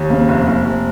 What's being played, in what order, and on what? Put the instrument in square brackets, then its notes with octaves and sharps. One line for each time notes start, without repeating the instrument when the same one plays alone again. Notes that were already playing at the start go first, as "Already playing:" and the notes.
Already playing: [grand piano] D#2
[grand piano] C#3 [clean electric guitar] A#3 C4
[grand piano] F1
F1
F1